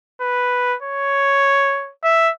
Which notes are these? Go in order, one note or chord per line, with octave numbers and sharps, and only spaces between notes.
B4
C#5
E5